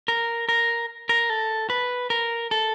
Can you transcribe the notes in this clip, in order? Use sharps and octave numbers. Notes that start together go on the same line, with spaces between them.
A#4
A#4
A#4
A4
B4
A#4
A4